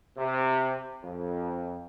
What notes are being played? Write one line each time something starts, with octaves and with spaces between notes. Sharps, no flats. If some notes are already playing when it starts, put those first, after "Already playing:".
C3
F2